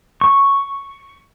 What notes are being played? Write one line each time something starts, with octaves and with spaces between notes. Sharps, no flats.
C#6